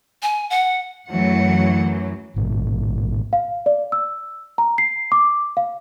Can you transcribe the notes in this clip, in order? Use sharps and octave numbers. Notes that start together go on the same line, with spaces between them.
G#5
F#5
F#2 E3 F#3 A3 F#5
A1 G#2 B2
F5
D5
E6
A#5
C7
D6
F5